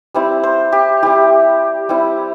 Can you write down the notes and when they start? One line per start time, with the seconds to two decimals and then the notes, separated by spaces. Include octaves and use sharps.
0.14 G3 C4 E4
0.44 C5
0.72 G4
1.03 G3 C4 E4 G4
1.89 G3 C4 E4